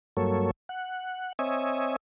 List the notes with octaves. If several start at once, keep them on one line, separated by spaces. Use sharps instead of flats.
G2 F#3 A#3 A4 C#5
F#5
C4 C#5 D#5 E5 G#5